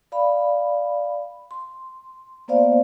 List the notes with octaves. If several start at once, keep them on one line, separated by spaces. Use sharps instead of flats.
D5 F5 B5
C6
A#3 B3 C5 D5 F5